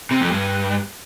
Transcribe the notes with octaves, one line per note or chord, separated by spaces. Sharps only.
C3
F2
G2